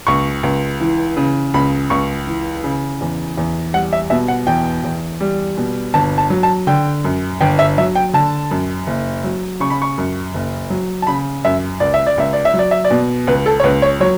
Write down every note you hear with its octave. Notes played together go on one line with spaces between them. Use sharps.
C#2 C#6
C#2
E3
C#3
C#2 B5
C#2 C#6
E3
C#3
E2
E2
G3 F#5
E5
B2 E5
F#5
E2 G5
E2
G3
B2
G1 A5
A5
F#3
A5
D3 G5
F#2
G1 G5
E5
F#3 E5
G5
D3 A5
F#2
F#1
F#3
C#3 C#6
B5
C#6
F#2
F#1
F#3
A5
C#3 B5
F#2 E5
C#2 D5
E5
D5
C#2 E5
D5
E5
F#3
D5
E5
D5
B2
C#2 B4
A4
C#5
C#2 B4
C#5
F#3 C#5